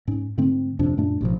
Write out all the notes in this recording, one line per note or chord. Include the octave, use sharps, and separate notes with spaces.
G#2 C#4
G#2 D3 A3 C4
D#1 F2 C3 D4
F#2 A#2 A3 D4
A1 B2 F3